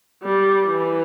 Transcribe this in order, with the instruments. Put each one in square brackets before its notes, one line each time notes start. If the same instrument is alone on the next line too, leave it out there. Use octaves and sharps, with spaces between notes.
[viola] G3
E3